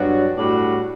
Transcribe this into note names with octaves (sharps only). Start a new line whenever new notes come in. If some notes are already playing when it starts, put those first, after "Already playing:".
Already playing: G2 F#3 B3 D4 F#4
A2 G3 D4 F#4